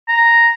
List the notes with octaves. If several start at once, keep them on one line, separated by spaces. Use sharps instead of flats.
A#5